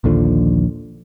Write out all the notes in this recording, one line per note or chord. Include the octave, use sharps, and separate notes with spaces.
A#1 D#2 D3 F3